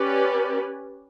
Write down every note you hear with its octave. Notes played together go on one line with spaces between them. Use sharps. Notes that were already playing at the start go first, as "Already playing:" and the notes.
Already playing: C#4 G4 B4 D5